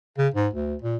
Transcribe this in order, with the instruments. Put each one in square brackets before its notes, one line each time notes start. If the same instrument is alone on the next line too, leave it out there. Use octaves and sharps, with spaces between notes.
[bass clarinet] C#3
G#2
D2
A#2